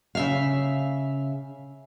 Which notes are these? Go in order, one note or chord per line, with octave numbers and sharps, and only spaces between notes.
C#3 E5 F5